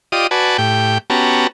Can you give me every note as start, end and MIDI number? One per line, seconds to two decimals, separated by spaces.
0.12 0.27 65
0.12 0.27 67
0.12 0.27 74
0.12 0.27 75
0.12 0.27 87
0.31 0.57 66
0.31 0.57 71
0.31 0.57 74
0.31 0.57 80
0.31 0.57 81
0.58 0.98 45
0.58 0.98 67
0.58 0.98 79
1.10 1.47 59
1.10 1.47 61
1.10 1.47 66
1.10 1.47 67
1.10 1.47 81
1.10 1.47 82